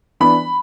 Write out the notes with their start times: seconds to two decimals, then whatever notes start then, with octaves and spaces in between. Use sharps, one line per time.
0.20 E3 B3 D4 B5